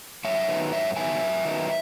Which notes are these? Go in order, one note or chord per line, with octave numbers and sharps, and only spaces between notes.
F#2 C#5 E5
D#3 F#3 B3 D#4
F#2 C#5 E5
D#3 F#3 B3 D#4 E5 G#5
F#2
D#3 F#3 B3 D#4